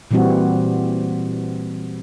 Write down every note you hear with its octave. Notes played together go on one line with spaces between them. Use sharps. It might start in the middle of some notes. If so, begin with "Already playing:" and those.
A#2 E3 G3 C4 F#4